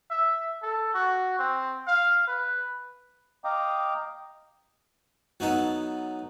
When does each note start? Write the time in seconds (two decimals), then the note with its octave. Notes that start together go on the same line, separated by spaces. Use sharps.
0.10 E5
0.63 A4
0.94 F#4
1.39 C4
1.87 F5
2.28 B4
3.44 D#5 F5 G5 A#5 D6 D#6
5.40 F#3 B3 D#4 A4